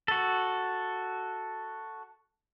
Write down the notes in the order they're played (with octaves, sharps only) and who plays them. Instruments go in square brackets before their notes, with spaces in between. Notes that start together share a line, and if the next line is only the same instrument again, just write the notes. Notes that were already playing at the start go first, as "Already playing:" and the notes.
[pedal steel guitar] F#4 A4